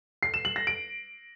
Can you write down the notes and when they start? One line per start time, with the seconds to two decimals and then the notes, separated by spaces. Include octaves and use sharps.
0.23 C7
0.34 E7
0.45 F#7
0.56 A#6
0.67 D7